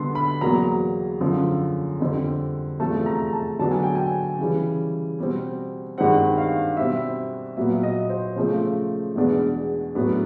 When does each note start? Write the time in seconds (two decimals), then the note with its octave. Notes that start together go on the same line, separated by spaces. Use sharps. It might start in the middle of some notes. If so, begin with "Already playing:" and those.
Already playing: D3 G3 B3 D4 C6
0.15 B5
0.41 E2 B2 F#3 A#3 A#5
1.21 F#2 D3 F3
2.00 F2 D3 G3 C4
2.80 E2 C3 F3 A3 A5
3.06 A#5
3.33 A5
3.59 D3 F#3 B3 D4 A5
3.71 G#5
3.83 G5
3.95 G#5
4.39 C#3 E3 G3
5.19 B2 G3 C4
5.98 G2 D#3 G#3 C4 F#5
6.38 F5
6.77 B2 G3 C4 E5
7.57 A#2 F#3 B3 E5
7.83 D#5
8.09 C5
8.36 C#3 F3 A3 C5
9.16 E2 B2 G#3 B3 D4
9.95 A2 F#3 B3 D4